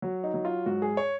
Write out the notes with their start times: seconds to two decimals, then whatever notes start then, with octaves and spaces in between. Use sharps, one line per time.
0.02 F#3 F#4
0.24 D#4
0.34 F#3
0.45 F4
0.66 G#2 F#4
0.82 G#4
0.97 C#5